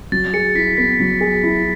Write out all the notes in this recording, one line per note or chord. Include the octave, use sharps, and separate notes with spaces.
F#3 A6
G#4 C#7
E4 B6
B3 B6
F#3
G#4
E4